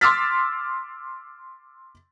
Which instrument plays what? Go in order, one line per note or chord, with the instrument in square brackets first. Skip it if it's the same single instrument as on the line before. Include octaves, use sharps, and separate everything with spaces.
[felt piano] C6 D6 E6 F6 A6 B6